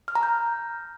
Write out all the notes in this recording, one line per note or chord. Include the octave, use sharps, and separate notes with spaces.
F6
A#5
G6